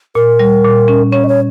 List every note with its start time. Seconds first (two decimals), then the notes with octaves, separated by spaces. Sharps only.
0.15 A#2 A#4
0.39 G3
0.64 A#2
0.88 C#4
1.12 C#4 C#5
1.24 D#5
1.28 C#5